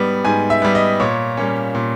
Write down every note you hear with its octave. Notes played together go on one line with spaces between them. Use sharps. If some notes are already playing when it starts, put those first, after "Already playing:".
Already playing: G#2 G3 B3
G#2 G#5
E5
G3 B3
D#5
A#2 C#5
G3 A#3 C#4
A#2